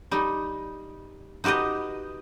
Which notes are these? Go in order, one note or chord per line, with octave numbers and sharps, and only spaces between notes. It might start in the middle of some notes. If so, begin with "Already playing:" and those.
G3 D#4
D#4 F#4 G4 B4 D#5